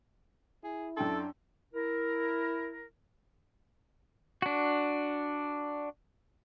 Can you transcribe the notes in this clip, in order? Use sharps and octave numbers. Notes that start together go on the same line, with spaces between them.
E4 G#4
F#2 D4 A4 G5 C6
E4 A#4
D4 F#4